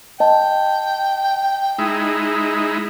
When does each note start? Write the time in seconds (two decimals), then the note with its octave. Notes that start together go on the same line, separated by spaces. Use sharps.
0.20 D#5 G5 A5
1.79 G#3 D#4 E4